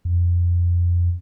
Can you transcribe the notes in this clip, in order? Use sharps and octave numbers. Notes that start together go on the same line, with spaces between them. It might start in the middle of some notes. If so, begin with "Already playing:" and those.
F2